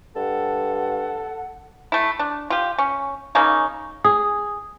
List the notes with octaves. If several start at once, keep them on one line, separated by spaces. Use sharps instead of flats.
G2 A4 F#5
A3 E4
D4
F4 G4
C#4
C#3 A#3 C#4 D#4
G#4 D#6